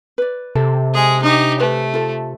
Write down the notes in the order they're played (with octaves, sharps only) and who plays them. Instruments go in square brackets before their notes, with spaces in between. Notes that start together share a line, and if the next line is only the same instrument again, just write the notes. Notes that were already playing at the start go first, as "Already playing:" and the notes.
[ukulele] B4 D5
[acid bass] C3 [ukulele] A4
[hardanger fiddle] G#3 G#4
[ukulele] D4 [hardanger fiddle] D#4 G4
[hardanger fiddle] A3 [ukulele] B4
[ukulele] F4 A4